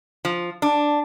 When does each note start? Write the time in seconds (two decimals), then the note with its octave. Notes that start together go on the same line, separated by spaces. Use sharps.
0.25 F3
0.62 D4